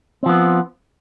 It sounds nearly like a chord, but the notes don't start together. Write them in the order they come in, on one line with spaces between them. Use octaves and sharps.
C4 F3 B3